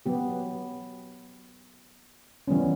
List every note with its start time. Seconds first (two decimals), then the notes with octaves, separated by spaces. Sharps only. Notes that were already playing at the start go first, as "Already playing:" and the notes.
0.06 F#3 B3 G4
2.48 E3 G3 B3 C#4